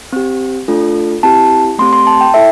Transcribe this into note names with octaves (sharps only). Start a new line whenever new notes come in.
C4 G4
A3 D4 F4 A4
C4 E4 G4 A5
A3 C4 G4 C6
C6
A5
G5
E4 A4 E5